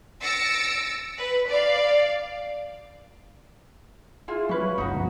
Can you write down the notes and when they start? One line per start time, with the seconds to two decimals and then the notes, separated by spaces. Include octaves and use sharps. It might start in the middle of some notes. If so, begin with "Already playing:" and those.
0.22 E6 A6 A#6 C#7 D7
1.18 B4
1.48 D5 F5
4.28 E4 F4 G#4
4.49 F#3 C#4 B4
4.78 G1 C#2 C#3 D#4 F#4
4.95 G2 B2 F3